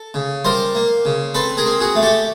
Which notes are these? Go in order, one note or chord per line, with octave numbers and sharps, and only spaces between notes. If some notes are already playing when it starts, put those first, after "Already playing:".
Already playing: A4
C#3
G3 A#4 C5
A#3
C#3
C4 A4 B4
G#4 A#4
C4
F#4 G#4
A3
G4 A4